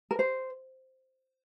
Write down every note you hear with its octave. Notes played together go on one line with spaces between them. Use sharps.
A#4
C5